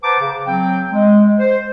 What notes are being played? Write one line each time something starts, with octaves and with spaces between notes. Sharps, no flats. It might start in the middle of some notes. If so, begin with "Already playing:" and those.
B4 C5 F#5 A5 A#5 D6
C#3
F#3 C4 G5
G#3
C5